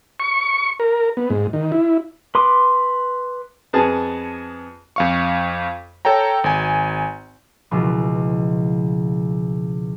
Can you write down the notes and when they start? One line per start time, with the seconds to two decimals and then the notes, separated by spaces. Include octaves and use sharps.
0.20 C#6
0.80 A#4
1.17 B3
1.30 G#2
1.53 D#3
1.72 E4
2.35 B4 C6 D6 D#6
3.73 F2 B3 G#4 A5
4.96 F2 F5 C#6
6.05 A4 C#5 G5 A#5
6.44 G#1 G#5
7.71 C#2 B2 E3 F3